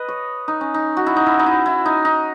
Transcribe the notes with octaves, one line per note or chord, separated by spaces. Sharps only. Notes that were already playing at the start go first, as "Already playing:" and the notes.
Already playing: B4 D#5
C#5
D#4
C#4
D#4
F#4
E4
D#4
E4
D#4
E4
E4
D#4
D#4